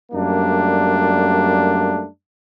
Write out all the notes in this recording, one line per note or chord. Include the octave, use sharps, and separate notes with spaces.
F#2 G3 A3 A#3 D4